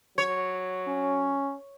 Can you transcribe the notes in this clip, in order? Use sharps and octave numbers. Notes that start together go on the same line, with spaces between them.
F#3 C#5
C#4